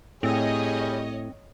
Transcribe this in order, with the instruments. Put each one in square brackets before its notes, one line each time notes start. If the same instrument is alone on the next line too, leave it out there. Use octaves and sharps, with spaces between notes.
[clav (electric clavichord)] A2 [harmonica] G3 G#4 [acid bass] C4 [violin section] C#5 D#5